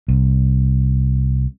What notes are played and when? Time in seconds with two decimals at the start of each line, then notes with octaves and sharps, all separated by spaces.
0.08 C2